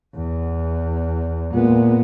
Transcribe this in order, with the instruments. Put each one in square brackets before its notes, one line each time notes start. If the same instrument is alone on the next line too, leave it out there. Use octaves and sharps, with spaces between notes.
[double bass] E2
[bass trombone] A#2 [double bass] G#3 B3